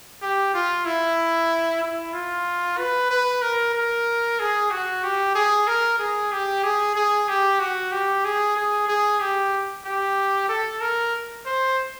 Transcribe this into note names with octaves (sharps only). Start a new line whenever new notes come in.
G4
F4
E4
E4
F4
B4
B4
A#4
A#4
G#4
F#4
G4
G#4
A#4
G#4
G4
G#4
G#4
G4
F#4
G4
G#4
G#4
G#4
G4
G4
A4
A#4
C5